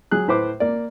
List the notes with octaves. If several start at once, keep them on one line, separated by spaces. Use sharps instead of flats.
F#3 G#4 F#6
A2 B4 C5 D6
A#3 D5